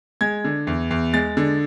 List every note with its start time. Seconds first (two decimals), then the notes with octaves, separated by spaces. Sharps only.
0.21 G#3 G#6
0.44 D3
0.67 E2
0.90 E2
1.14 G#3 A6
1.37 D3